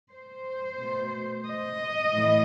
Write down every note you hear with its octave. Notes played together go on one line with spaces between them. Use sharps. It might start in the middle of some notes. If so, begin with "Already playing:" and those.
C5
B2 A3
D#5
A2 E3